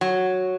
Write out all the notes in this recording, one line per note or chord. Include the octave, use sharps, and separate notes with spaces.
F#3